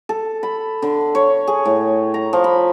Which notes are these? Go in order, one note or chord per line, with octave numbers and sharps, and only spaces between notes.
A4
B5
D3
C#5
G#4
A2
A#5
F3
B5